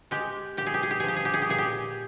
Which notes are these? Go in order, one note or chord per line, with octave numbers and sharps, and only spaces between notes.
G#3 G4
A#2 G4
G#4
G4
G#4
G4
F3 G#4
G4
G#4
G4
G#4
G4
A#2 G#4
G4